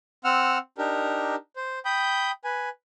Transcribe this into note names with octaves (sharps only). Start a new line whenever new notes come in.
C4 F#5 E6 F6
D4 D#4 G4 A#4
C5
G5 B5 D#6 G6
B4 G#5